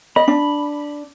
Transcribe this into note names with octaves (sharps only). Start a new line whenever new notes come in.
D#5 B5
D4